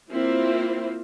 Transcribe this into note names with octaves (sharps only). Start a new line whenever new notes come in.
A#3 C4 E4 F4 C5